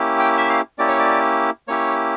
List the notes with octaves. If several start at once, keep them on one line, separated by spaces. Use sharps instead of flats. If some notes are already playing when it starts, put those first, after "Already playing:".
Already playing: A#3 C#4 E4 G4
G5
E5
F5
A#3 C#4 E4 G4 D5
C#5
D5
A#3 C#4 E4 G4 C#5